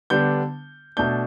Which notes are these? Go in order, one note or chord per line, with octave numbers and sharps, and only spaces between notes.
D3 G3 B3 D4 G6
B2 A3 D4 G6